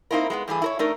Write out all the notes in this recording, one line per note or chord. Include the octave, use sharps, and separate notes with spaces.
A#3 C4 D#4 E4 A#4
G#3 A#3 B3
G2 E3 A3 G#4
E4 A#4 C#5
A3 D4 D#4 A#4